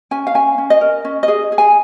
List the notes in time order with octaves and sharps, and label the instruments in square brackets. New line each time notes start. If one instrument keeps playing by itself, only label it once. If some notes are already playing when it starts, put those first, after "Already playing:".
[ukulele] C#4 G#5
F5
C#4 G#5
C#4
D#5
A#4
C#4
D#5
G#4
G#4
G#5